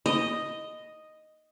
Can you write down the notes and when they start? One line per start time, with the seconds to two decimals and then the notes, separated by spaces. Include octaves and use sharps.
0.06 D#5